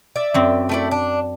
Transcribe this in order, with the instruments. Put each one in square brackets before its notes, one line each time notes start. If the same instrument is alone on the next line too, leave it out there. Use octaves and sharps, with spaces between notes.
[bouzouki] D5 E5
[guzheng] F#2 C4
[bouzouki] A3 E4 D5
D4